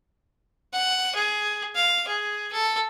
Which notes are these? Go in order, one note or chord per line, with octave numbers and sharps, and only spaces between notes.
F#5
G#4
F5
G#4
A4